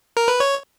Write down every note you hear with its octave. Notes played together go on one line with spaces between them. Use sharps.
A#4
B4
C#5